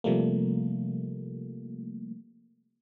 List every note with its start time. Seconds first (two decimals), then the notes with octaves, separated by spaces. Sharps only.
0.04 C3 F3 G3 A3 A#3